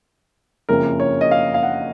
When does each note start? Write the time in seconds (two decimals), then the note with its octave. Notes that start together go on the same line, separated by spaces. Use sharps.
0.69 F#1 F2 C#3 A#4
1.00 C#5
1.21 D#5
1.31 F5
1.54 F5
1.63 F#5